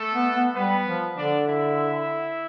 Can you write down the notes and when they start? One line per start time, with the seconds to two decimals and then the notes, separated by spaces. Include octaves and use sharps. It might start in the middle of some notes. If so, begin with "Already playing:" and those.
Already playing: A3 A4
0.14 B3
0.35 B3
0.54 G3 B3 B4
0.85 F3
1.16 D3 D4 D5
1.47 E4 E5